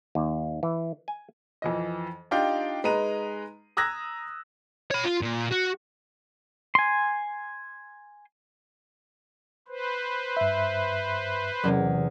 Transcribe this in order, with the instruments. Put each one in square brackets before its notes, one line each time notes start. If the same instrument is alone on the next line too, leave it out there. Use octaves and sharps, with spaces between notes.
[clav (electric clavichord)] D#2
E3
G#5
[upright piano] F2 E3 D#5
D4 D#4 F4 G4 F5 G5
G#3 D#4 B4 A#5 D#7
A#5 D#6 E6 F#6 G#6 A#6
[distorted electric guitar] C#5 B5
F4
A#2
F#4
[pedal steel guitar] G#5 C6
[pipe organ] B4 C5
[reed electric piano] G2 E5
[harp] E2 C3 [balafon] F#3 C#4 A#4